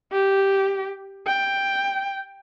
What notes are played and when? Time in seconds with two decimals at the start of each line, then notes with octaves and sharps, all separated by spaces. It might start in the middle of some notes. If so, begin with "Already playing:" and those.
0.12 G4
1.27 G5